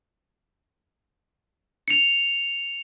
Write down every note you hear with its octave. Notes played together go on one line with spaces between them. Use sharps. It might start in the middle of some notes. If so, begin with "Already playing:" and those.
C#7 F7